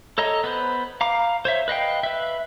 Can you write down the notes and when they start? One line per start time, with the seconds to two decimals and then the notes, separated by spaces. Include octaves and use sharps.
0.18 A4 C#5 D#5 A#5
0.44 B3 B4 C5
1.01 F5 A#5 D6
1.45 C5 C#5 E5
1.68 B4 D#5 F5 G5
2.03 B4 E5